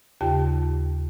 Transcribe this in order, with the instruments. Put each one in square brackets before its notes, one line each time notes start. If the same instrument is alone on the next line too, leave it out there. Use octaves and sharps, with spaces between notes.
[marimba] D#2 C#3 F4 G4 G5 A5